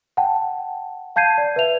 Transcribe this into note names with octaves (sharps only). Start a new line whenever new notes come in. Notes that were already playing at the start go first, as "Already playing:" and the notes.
F#5 G5 A5
F5 A5 G6 G#6 C7 D#7
D5
B4 E5 F7